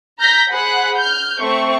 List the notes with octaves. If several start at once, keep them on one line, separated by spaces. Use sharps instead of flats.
A#5 F6 G6 A#6 B6
G#4 C5 F#5 B5 F#6
F6 G6
A3 C4 C#6